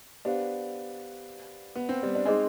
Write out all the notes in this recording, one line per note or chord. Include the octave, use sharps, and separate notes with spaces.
B3 D4 G4 C5 F5
B3
C4
G3 B3
D4
G#3 C4 D#4 G#4 C5 D#5 G#5